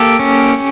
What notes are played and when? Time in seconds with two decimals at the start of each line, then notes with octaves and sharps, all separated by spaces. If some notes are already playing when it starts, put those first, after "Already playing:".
Already playing: A#3 G4 A4
0.19 C#4